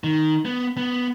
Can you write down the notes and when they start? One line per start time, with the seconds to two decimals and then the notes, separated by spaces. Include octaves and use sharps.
0.04 D#3
0.45 B3
0.77 B3